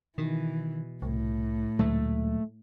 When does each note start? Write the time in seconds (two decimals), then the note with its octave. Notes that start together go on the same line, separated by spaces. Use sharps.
0.18 B2 D#3 E3
1.02 C2 A2
1.79 D2 A#2 F#3 G#3 A3